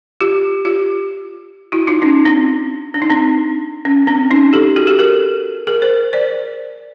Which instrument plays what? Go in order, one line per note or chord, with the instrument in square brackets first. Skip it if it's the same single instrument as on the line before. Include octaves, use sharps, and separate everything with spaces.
[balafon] F4 G4
F4 G4
E4 F#4
D#4 F4
C#4 D#4
C4 D4
D4
D#4
C4 D4
C#4
C4 D4
C#4 D#4
G4 A4
F#4 G#4
G4 A4
G#4 A#4
G#4 A#4
A#4 C5
C5 D5